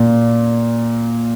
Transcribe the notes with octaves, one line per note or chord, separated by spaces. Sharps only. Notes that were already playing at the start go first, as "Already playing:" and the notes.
Already playing: A#2